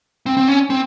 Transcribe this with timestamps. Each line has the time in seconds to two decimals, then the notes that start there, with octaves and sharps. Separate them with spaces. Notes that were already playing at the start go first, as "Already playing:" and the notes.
0.26 C4
0.37 C4
0.48 C#4
0.70 C4